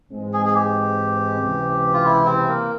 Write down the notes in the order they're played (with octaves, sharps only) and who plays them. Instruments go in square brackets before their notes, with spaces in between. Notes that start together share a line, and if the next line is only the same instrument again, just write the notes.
[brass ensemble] G#2 E3 G#3 C4
[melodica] G#4
G#4
G4
[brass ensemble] C#2 C3 E3
[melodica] F4
E4
C4
A#3